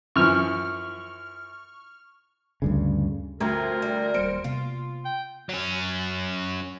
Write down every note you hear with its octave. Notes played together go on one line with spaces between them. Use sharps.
F#2 E3 F3 C#6 F6
D2 G2 C#3
D2 F3 C4 A#4 A#5 G#6
G3
D#1 G3 A#3 C5 C#7 D7
C3 A#3 B3 F4
G5
F#3 C#4